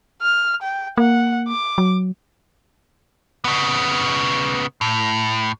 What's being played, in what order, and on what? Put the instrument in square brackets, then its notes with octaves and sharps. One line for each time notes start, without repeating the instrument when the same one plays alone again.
[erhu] F6
G5
[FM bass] A#3 [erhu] F#5
[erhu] D6
[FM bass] F#3
[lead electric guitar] C#3 B3
A2